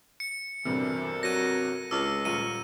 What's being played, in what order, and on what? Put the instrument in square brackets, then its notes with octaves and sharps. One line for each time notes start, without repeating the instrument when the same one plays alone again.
[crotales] C#7
[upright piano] B1 G2 C3 [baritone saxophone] E3 [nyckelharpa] A4 A#4
[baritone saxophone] F#3 [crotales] A#6 D#7
[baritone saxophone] C#2 [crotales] E6
[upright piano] D#1 F4 [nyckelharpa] C#6 [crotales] D#7